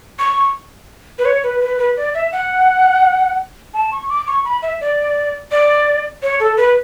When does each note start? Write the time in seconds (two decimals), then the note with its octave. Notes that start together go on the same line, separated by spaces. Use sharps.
0.19 C#6
1.18 B4
1.25 C#5
1.43 B4
1.61 B4
1.78 B4
1.97 D5
2.14 E5
2.32 F#5
3.74 A5
3.92 C#6
4.09 D6
4.27 C#6
4.45 B5
4.62 E5
4.81 D5
5.51 D5
6.22 C#5
6.40 A4
6.57 B4